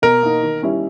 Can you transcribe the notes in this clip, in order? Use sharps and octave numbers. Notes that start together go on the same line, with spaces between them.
B2 A#4
A#3 D#4
D#3
G3 C#4 E4